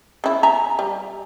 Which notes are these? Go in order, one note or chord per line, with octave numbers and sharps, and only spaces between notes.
C#3 E4
E5 G#5 A#5
G3